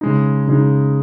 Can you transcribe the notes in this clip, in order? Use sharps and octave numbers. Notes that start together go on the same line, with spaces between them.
C#3 G#3 D#4
C#3 G#3 D#4